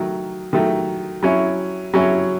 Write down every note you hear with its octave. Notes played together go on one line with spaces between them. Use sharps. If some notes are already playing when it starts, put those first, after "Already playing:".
Already playing: D#3 F#3 A3
D#3 F#3 A3
F#3 C#4 E4
F#3 C#4 E4